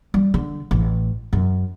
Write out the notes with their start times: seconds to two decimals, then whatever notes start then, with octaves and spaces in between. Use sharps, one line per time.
0.14 G3
0.34 D3
0.71 A1
1.33 F#2